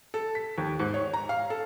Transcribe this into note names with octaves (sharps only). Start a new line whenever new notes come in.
A4
B6
D#2
G#2
C#5
A#5
F5
A4